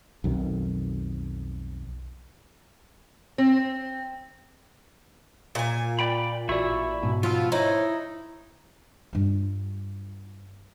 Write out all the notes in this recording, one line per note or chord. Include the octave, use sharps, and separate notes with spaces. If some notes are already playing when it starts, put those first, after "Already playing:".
B1 F2 D#3
C4
A#2 G#5
D5 G5 B5
A1 E4 F#4 D5 E5 C#6
G#2 B2
F3 B3 F4 E6
D#4 E4 C5 C#5
G2 F4